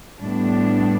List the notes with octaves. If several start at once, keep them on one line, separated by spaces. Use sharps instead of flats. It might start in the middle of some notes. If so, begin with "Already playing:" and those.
A2 G3 B3 D4